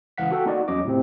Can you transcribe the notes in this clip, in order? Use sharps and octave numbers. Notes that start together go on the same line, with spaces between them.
C#2 E3 F5 F#5 B6
F#4 A4 F#5 G5
A#3 D#4 F#4 D5
E2 F#3 C#4 D#5 D6
A2 C3 C4